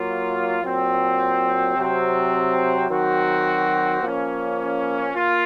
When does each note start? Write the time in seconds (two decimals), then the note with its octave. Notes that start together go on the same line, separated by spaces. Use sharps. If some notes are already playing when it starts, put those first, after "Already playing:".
Already playing: F#3 A#3 F4
0.62 A#2 F#3 C4
1.76 C3 F#3 C4
2.89 D#3 F#3 C4 F#4
4.02 F3 A#3 C#4
5.14 A#3 F4